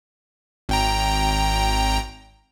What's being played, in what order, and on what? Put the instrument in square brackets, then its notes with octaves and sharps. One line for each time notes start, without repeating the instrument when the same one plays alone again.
[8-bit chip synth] G#1 G5 A#5